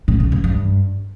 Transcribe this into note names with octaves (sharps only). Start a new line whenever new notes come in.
A2
C#3
E3
G2